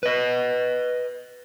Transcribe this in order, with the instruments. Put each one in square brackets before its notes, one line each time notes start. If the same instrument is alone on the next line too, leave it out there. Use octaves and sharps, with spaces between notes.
[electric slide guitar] B4 D#5